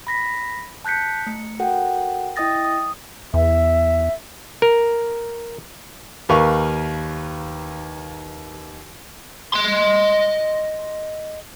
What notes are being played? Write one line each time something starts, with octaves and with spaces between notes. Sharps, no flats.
B5 A#6 B6
A5 F#6 G6 B6 C#7
A3 C#7
F#4 A4 A#4 F#5 G5
E4 D#5 G5 D#6 A6 A#6
D#6
E2 E5
A#4
D#2 A#4 B4 F5 C#6
D#5 C6